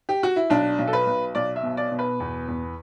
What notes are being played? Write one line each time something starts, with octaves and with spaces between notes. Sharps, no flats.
G4
F#4
E4
B1 D4
B1
A4
B4
B1
B1 D5
E5
B2
D5
B2
B4
E2
E2